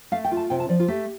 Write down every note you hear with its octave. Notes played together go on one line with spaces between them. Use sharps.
A3 F5
G5
F4
A5
C3 G5
A5
F3 D5
F4
A3 G4